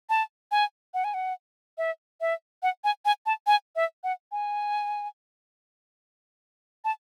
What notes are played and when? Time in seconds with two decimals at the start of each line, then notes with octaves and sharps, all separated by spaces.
0.10 A5
0.51 G#5
0.94 F#5
1.04 G#5
1.14 F#5
1.78 E5
2.21 E5
2.63 F#5
2.84 G#5
3.05 G#5
3.26 A5
3.47 G#5
3.76 E5
4.04 F#5
4.32 G#5
6.85 A5